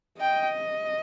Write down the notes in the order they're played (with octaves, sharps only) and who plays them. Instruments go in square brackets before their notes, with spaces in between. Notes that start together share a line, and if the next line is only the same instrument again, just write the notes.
[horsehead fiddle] D#5 [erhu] G5